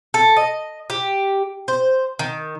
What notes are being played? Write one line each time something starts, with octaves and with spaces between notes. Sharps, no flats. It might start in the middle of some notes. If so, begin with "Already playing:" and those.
A4
D#5
G4
C5
D#3